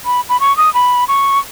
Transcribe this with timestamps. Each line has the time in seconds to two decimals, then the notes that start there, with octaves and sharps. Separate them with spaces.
0.06 B5
0.29 B5
0.40 C#6
0.57 D#6
0.74 B5
1.08 C#6